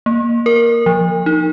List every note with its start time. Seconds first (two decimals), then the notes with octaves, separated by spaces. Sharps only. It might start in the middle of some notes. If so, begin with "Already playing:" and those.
0.06 A#3
0.46 A#4
0.86 F3
1.26 D#4